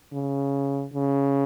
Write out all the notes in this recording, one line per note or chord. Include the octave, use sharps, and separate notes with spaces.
C#3
C#3